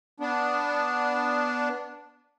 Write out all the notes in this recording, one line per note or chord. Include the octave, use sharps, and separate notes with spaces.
B3 D4